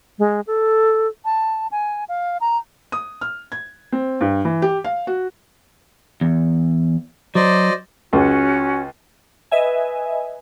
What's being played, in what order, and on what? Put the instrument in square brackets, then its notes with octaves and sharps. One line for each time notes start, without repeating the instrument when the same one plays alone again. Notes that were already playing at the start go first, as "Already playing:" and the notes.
[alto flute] G#3
A4
A5
G#5
F5
A#5
[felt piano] D#6
F6
G#6
C4
G2
E3
G4
F5
F#4
[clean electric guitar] E2
[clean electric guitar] F#3 [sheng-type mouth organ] C5 D5 D#5
[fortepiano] C#2 [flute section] C#4 F#4
[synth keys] B4 D#5 E5 G#5